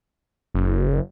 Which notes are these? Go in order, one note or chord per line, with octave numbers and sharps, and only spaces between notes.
F#1